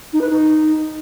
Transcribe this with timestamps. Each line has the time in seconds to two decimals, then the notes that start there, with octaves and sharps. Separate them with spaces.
0.13 D#4
0.21 B4
0.29 D#4